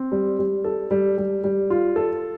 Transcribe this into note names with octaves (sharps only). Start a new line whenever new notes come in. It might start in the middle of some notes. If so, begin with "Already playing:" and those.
Already playing: C4
G3
G3
A4
G3
G3
G3
F4
A4